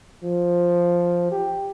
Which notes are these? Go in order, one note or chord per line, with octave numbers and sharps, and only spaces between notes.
F3
G4